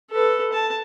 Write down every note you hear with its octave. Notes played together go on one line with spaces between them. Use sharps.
A4 B4
A5